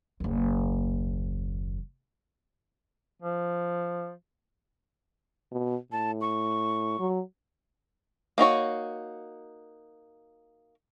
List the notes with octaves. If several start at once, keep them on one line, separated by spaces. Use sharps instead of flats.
F#1 D#2
F3
B2
A2 A5
C#6
F#3
A#3 D#4 F#4 C#5